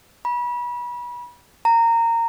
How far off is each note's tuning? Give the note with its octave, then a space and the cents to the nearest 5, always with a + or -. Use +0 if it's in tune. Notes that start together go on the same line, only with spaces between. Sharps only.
B5 -30
A#5 -20